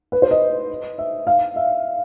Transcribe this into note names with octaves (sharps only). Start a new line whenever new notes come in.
B4
C5
D#5
E5
F5
E5